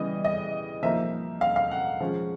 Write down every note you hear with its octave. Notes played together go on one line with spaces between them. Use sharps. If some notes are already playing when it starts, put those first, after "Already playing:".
Already playing: C#3 E3 G3 B3 D#5
D#5
F3 A#3 D#4 E5
F5
F5
F#5
F3 G#3 C#4